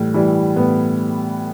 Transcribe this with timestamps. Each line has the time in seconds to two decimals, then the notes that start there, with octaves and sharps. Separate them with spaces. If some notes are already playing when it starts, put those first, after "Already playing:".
Already playing: A2 E3 G3
0.14 E3 G3
0.56 A2 B3